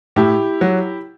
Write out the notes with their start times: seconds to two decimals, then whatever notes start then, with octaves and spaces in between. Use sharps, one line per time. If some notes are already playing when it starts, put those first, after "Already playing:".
0.16 A2 E4 G4
0.61 F#3